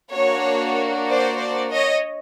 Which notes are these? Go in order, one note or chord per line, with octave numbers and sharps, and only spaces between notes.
A#3 D4 F#4 C#5
C5 D5
C5 D5
C#5 D#5